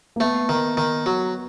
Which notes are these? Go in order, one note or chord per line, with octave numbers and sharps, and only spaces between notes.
A#3
A3 B3
D#3
D#3
F#3